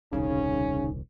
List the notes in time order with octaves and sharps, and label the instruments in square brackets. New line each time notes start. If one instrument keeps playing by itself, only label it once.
[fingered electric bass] D#1 C2 [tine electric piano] C#3 [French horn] C#4 [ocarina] D#4